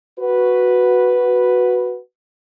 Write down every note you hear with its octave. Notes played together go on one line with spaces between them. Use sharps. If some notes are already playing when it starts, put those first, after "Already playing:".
F#4 B4